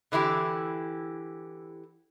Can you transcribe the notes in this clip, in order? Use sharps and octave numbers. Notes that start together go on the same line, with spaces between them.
D3 E3 E4 G4